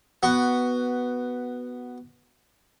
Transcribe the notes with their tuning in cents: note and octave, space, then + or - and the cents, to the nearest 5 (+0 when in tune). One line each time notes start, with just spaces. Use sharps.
B3 +0 F#4 +10